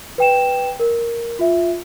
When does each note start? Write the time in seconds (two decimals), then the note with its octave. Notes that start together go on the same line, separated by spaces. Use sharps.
0.18 B4 G5 E7
0.79 A#4
1.39 F4 E5